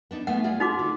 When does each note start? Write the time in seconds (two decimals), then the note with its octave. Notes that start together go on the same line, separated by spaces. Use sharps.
0.11 B3 D4 D#4
0.27 A3 B3 F#5
0.44 F4 G#4 D5
0.60 D#4 F#4 D6
0.79 D3